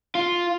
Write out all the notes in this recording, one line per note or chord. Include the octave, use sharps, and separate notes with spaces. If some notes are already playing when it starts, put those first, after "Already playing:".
F4